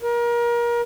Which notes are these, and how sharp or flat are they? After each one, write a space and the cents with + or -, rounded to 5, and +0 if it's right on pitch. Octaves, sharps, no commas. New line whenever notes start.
A#4 +30